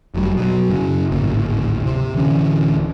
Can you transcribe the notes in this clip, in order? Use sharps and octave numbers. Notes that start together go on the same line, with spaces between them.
F1 F#3 G3
B2 F#3
F#2 C#3
D1 G#1 A#3
C3
D1 D3 E3 C#4